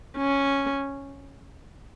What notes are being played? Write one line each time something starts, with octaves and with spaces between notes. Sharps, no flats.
C#4